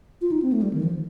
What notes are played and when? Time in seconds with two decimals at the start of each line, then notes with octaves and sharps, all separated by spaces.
0.21 F4
0.32 D#4
0.42 C4
0.52 A3
0.62 G3
0.73 D#3
0.83 F3